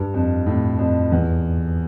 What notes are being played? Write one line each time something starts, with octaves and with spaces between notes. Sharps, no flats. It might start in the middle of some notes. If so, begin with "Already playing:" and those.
Already playing: G2
F2
A2
F2
E2